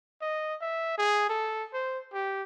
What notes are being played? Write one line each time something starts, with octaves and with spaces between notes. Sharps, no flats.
D#5
E5
G#4
A4
C5
G4